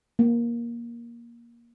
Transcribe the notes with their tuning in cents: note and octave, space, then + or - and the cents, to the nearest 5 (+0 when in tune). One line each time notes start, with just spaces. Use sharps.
A#3 +15